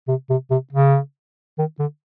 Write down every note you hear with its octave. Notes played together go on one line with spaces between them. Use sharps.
C3
C3
C3
C#3
D#3
D3